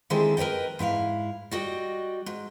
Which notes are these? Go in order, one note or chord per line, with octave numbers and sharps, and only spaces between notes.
D3 D#3 G#3 C4 E4 G4
A#4 B4 C#5 D#5 G5
G#2 E4 A4 F5
G3 F#4 D#5 G5
G#2